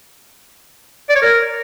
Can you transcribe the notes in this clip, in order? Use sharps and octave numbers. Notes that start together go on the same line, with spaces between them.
D5
C#5
A#4